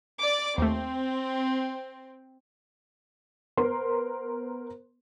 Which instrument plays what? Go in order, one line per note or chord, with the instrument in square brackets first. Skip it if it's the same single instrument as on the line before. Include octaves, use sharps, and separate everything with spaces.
[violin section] D5 D6
[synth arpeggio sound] D#2 A3 [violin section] C4
[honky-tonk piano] B3 A#4 C5 C6